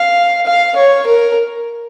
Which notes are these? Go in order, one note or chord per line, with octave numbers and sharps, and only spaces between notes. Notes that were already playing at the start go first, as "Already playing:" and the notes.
Already playing: F5
F5
C#5
A#4